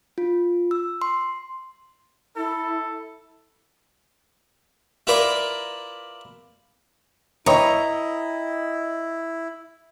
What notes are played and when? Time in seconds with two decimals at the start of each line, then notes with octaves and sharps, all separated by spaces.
0.18 F4
0.71 E6
1.02 C6
2.36 E4 A4
5.07 E4 F4 A#4 B4 D5
7.46 E4 B4 C#5 D#5 G5 A#5